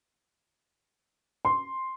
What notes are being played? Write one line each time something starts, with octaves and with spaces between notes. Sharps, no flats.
C6